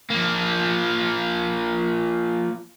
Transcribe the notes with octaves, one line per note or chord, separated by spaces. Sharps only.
F3 A#3